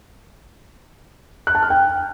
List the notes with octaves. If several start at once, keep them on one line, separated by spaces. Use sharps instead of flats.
F#6
A5
F6
G5